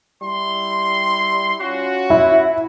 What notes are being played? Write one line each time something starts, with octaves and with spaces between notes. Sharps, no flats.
G3 E4 C6
C#4 F4 F#4
E4